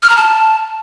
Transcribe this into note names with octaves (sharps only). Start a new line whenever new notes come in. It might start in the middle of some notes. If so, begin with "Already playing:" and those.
F6
A#5
A5